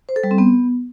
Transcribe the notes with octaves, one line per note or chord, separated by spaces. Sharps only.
C5
A4
G3
C4
B3